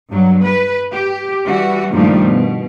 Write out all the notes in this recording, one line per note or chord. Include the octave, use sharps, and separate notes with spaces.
G2 F#3
B4
G4
E3 G3 F#4
G2 A#2 D#3 F3 G3 A3
B2